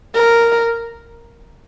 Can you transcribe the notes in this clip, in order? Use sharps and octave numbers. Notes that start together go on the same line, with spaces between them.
A#4